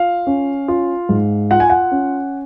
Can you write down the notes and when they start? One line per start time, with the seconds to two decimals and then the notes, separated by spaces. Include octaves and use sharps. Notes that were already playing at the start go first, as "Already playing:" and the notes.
Already playing: F4 F5
0.27 C#4
0.68 F4
1.09 G#2
1.51 F4 F#5
1.60 G#5
1.70 F#5
1.92 C#4